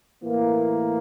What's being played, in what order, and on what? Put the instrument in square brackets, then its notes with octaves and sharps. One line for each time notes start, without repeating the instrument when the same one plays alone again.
[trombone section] A2 E3 A#3